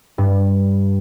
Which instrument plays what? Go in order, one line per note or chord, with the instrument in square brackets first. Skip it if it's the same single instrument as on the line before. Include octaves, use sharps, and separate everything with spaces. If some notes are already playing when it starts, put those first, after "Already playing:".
[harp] G2